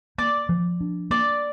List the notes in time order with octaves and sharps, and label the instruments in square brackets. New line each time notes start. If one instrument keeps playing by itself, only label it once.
[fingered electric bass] A#3 [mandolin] D5
[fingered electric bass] F3
D4
[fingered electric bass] A#3 [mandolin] D5